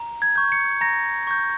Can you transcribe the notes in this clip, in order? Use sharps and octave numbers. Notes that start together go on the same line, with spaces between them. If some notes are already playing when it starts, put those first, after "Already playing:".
Already playing: A#5
G#6
C#6 G6
C#7
A#5 A#6
C#6 G6